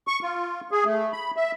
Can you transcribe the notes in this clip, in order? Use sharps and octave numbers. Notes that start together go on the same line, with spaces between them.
C#6
F4
G#4
A3
B5
E5